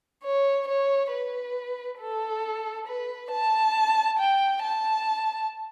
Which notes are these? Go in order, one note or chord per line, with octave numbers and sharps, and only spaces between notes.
C#5
C#5
B4
A4
B4
A5
G5
A5